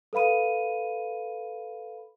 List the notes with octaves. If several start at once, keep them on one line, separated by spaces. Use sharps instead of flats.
A4 B4 F5 B5 D#7